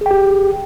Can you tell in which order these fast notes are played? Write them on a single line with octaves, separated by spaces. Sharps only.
G#4 G5 G4